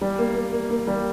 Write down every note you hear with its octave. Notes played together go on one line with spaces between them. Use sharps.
G3
A#3
A#3
A#3
A#3
G3